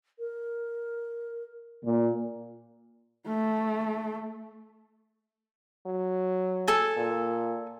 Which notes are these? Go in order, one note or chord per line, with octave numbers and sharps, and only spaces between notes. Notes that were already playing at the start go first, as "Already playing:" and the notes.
A#4
A#2
A3
F#3
A4 G#5
A#2